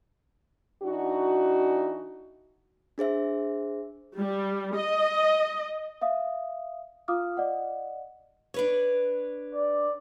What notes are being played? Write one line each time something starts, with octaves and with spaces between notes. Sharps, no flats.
E3 D4 D#4 F#4
D4 G#4 C5 E5
G3
D#5
E5 F5 D#6
F4 F5 D6 D#6 F6
D5 D#5 F#5
D4 B4 C#5
D5